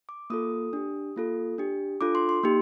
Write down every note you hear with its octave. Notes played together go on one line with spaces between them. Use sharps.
D6
A#3 F4 A4 D#6
D4 G4
A#3 F4 A4
D4 G4
D4 F4 A4 D6
C6
C6
A#3 D#4 G4